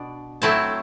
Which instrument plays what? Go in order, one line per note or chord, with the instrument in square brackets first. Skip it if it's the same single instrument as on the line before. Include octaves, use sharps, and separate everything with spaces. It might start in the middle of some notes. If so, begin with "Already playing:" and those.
Already playing: [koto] B2 D4
F#3 A3 C4 E4 A5